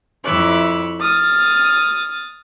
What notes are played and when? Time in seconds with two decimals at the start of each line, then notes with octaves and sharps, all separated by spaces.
0.24 F2 E4 C#5 E5 D6 F#6
1.00 D#6 F6 A6